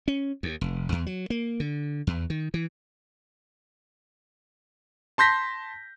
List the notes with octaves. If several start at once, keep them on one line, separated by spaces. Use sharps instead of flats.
C#4
D#2
F1
E2
F#3
A#3
D3
E2
D#3
E3
A5 C6 G6 A#6 B6